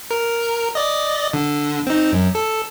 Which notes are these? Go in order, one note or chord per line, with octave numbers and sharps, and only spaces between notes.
A#4
D5 D#5
D3
C4 D#4
F#2
A4